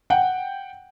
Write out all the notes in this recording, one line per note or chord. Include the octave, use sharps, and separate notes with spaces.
F#5 G5